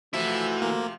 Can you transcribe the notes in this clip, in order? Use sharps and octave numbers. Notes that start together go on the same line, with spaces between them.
C3 E3 F3 A3 E4 F#4 E5
A#3